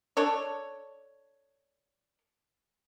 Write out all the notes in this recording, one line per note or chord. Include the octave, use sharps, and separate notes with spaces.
D4 A4 C#5